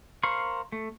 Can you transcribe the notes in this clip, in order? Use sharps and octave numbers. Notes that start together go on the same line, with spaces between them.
A#4 C5 F5 B5 C#6
A3